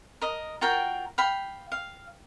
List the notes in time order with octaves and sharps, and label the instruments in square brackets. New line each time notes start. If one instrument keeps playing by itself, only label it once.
[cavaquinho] A#4 D#5
F4 F#4 A#4 G5
F5 G5 B5
F5